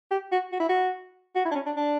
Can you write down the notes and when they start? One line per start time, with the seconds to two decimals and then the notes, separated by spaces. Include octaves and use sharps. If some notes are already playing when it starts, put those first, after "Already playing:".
0.11 G4
0.32 F#4
0.52 F#4
0.60 E4
0.69 F#4
1.35 F#4
1.45 E4
1.51 D4
1.55 C#4
1.66 D4
1.76 D4